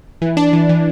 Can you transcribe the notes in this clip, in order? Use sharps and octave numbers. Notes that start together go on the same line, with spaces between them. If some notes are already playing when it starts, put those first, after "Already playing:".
E3
D4
E3
E3